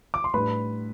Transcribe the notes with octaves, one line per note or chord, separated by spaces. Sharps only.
D6
C6
A2 G3 D4 B4 B5